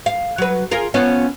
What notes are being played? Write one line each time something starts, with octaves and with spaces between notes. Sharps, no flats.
F5
F#3 B4
F4 G#4 A#4
F3 B3 C#4